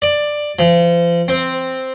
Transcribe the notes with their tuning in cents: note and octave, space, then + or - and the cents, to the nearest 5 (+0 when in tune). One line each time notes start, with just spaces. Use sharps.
D5 +10
F3 -35
C4 +0